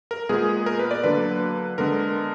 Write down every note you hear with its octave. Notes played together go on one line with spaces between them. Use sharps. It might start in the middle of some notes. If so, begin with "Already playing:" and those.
A#4
A#2 G#3 B3 G#4
A#4
B4
D5
D3 F#3 A#3 B4
D3 G#3 B3 A#4